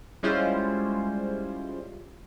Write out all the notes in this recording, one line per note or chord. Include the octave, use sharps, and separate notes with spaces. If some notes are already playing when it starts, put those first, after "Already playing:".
G3 G#3 C#4 E4 F4 C5